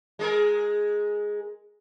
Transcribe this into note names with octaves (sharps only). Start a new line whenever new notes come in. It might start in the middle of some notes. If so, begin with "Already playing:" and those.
G#3 G#4 A#4